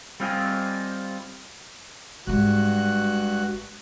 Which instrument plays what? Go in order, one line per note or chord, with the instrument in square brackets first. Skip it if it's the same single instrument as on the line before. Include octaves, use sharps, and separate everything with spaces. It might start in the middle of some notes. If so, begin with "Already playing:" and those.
[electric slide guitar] G3 C4 F4 F#4 D#5 G#5
[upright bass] G#1 G#3 [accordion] G2 F#4 F#6